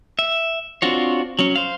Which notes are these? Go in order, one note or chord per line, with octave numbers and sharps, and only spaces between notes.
E5
C4 D4 F4 F#4 C#5
F#3 C#4
C5 F5